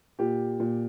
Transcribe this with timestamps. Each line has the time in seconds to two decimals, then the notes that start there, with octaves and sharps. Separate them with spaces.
0.19 A#2 G4
0.60 A#2